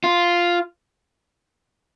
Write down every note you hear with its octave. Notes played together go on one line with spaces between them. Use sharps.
F4